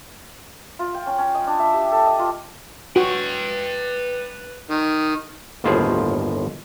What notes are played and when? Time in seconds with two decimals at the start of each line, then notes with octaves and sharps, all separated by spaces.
0.79 F4
0.94 G5
1.06 C#4
1.18 C#4
1.35 D#5
1.47 D4
1.59 E5
1.74 G4
1.92 A4
2.06 D#5
2.19 F4
2.96 F#4 B4 G5
4.70 D#3
5.64 G1 D#2 A2 F4 G#4 C5